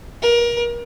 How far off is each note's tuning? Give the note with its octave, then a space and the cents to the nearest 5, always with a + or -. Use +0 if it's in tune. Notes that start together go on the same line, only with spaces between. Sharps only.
A#4 +30